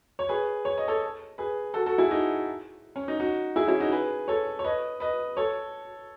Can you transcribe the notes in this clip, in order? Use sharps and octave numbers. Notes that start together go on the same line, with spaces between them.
C#5
G#4 B4
C#5
D#5
A4 C#5
G#4 B4
F#4 A4
F#4 A4
E4 G#4
D#4 F#4
C#4
D#4
D#4 F#4
E4 G#4
C#4 E4
D#4 F#4
G#4 B4
A4 C#5
C#5
B4 D#5
B4 D#5
A4 C#5